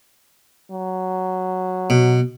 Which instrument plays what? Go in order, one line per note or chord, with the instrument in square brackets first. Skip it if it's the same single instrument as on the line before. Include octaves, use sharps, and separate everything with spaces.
[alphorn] F#3
[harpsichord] B2